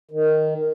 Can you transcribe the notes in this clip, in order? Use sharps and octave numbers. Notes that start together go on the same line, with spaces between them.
D#3